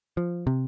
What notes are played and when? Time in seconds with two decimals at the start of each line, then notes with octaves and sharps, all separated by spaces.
0.17 F3
0.47 C3